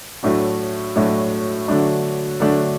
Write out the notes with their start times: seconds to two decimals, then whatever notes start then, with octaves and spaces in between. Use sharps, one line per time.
0.23 A2 F#3 A3 D4 F#4
0.96 A2 F#3 A3 D4 F#4
1.68 D3 F#3 A3 D4
2.40 D3 F#3 A3 D4